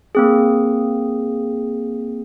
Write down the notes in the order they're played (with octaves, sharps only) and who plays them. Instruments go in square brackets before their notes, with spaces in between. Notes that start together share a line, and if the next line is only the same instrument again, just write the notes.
[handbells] A#3 C4 G#4